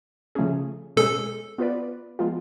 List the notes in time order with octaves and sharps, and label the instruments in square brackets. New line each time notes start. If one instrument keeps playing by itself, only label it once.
[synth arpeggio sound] C#3 F3 A3 C#4 G#4
[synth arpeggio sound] B2 G#3 C#4 G#4 [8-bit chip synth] A4
[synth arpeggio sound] B3 F4 B4 D5
F3 G#3 B3 F4